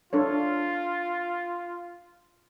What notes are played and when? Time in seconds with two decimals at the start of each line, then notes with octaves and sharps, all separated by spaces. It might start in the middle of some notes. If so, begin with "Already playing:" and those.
0.13 D4 F4 A4 C#5